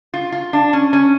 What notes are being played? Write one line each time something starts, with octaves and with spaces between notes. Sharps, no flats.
F4
F4
D4
C#4
C#4